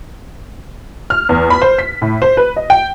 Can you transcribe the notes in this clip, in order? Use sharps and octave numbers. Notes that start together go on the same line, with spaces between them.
F6
E2
B5
C5
B6
A2
C5
B4
D#5
G5